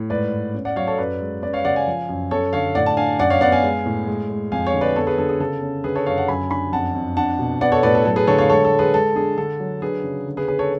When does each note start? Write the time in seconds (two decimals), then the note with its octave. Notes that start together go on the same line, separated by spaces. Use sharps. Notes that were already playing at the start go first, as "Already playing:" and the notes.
Already playing: A2
0.10 G#2 B4 D5
0.32 G#2
0.54 C#4
0.65 D5 F#5
0.76 F#3 C#5 F5
0.87 A4 C#5
0.98 F#2 B4 D5
1.21 G#3
1.42 C#4 B4 D5
1.53 C#5 F5
1.65 C#3 D5 F#5
1.76 F5 G#5
1.87 F3
2.09 F#2
2.31 C#4 A4 C#5
2.53 D3 C#5 F5
2.75 A2 D5 F#5
2.86 A5
2.97 D4 F5 G#5
3.19 F#2 D5 F#5
3.30 C#5 F5
3.41 B3 D5 F#5
3.52 F5 G#5
3.63 G#3
3.86 A2
4.07 G#3
4.30 G#3
4.52 F2 F5 G#5
4.67 C#5 F5
4.74 D3
4.81 B4 D5
4.96 B3 A4 C#5
5.07 G#4 B4
5.18 D3 A4
5.29 G#4
5.40 C#3 A4
5.62 C#4
5.84 D3 G#4 B4
5.95 A4 C#5
6.06 F#2 C#5 F5
6.18 F#5 A5
6.28 F#2 G#5 B5
6.50 D4 G#5 B5
6.72 F2 F#5 A5
6.95 F2
7.17 D4 F#5 A5
7.39 B2
7.61 B3 D5 F#5
7.72 A4 C#5
7.83 A2 B4 D5
7.95 A4
8.05 F#3 A4
8.16 G#4 B4
8.27 D3 A4 C#5
8.38 C#5 F5
8.50 G#3 A4 C#5
8.65 A4
8.72 G#3
8.79 G#4 B4
8.93 G#3 A4
9.16 D4 G#4
9.37 D3 A4
9.60 F#3
9.82 D4 G#4 B4
10.04 C#3
10.27 D3
10.37 G#4 B4
10.48 C#4 G#4 B4
10.59 A4 C#5